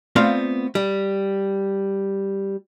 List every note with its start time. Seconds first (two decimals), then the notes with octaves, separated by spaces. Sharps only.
0.16 A3 B3 C4 F4 D5 F5
0.75 G3